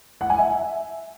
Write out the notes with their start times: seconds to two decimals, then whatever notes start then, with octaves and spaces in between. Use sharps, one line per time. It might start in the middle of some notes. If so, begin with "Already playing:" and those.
0.21 F#5
0.30 G#5
0.39 E5